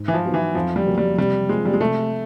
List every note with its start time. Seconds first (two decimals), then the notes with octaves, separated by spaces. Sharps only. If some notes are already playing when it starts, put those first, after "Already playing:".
Already playing: G#2
0.08 E3
0.14 F3
0.24 D#3 F#3 B3 E4
0.34 E3
0.55 F2 F3
0.76 G3
0.87 C#3 F#3 A#3 C#4
0.98 G3
1.18 C3 G3
1.49 F3 G#3 A#3
1.65 G3
1.74 G#3
1.80 C3 A3